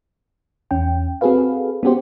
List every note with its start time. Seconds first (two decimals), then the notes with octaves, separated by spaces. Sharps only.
0.71 E2 C#4 G5
1.21 C4 F#4 G#4 A4 B4 F5
1.83 B3 C#4 F#4 G4 C5